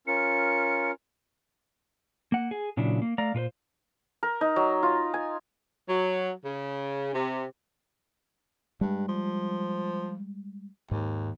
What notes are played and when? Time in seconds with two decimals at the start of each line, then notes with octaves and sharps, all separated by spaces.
0.07 C#4 F4 A#4 C#7
2.32 A#3 F#5
2.51 G#4
2.77 A#2 C#3 F#3 D4 E4
3.02 A#3
3.18 A3 D5 F5 A#5
3.34 A#2 F4 B4 C5
4.23 A#4
4.41 D#4
4.56 F#3
4.83 F4
5.14 G#5
5.88 F#3
6.45 C#3
7.14 C3
8.81 G2 G3 G#3
9.08 F3
10.91 D#2 G#2